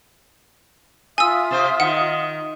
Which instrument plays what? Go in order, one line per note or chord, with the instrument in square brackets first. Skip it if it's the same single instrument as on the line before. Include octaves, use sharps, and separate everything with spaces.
[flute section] F4 E5 D#6 [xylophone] G#5 E6
[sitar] C3 C5
[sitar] D#3 [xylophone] F#5